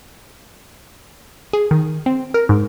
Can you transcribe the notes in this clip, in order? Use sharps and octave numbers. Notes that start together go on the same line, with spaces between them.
G#4
D#3
C4
A#4
G#2